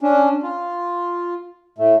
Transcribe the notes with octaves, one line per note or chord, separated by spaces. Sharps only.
C#4 D4
F4
A2 A3